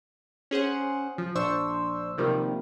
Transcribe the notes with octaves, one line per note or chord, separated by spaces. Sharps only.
C#4 G#4 C5 F#5
F3
A#1 D4 C5 C#6 E6
C3 D#3 F3 G3 A#3